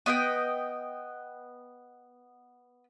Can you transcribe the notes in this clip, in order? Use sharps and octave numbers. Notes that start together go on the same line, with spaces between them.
B3 D#5 F5 G5